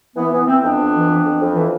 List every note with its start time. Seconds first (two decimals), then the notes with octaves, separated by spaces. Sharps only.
0.16 E3 B3
0.32 E3 B3
0.47 E3 C4
0.62 F2 B3 D4
0.78 F2
0.93 E3
1.09 F2
1.24 F2
1.40 F2
1.55 E3